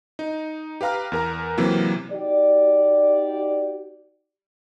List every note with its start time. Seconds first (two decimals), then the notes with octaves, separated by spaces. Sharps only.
0.19 D#4
0.81 G4 B4 F5 A#5 F6
1.12 E2 A#4 A#5
1.58 C3 E3 F#3 A#3
2.12 D#4 F#4 G4 D5